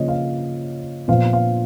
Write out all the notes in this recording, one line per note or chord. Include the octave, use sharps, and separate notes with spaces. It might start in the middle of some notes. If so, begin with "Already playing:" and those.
Already playing: C#3 F3 A#3 C#5 D#5
F5
A#2 F3 B3 F5
F5